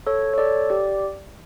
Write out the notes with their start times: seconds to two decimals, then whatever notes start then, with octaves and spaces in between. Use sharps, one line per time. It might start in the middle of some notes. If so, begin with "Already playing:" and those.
0.07 A4 C#5
0.34 C#5
0.38 A4 D5
0.70 G4 D5